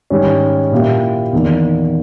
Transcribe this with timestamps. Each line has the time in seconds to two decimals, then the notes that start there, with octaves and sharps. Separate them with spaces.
0.10 G#2 D#3 G3 C#4
0.72 A#2 A#3 E4 G4
1.33 E2 D#3 A#3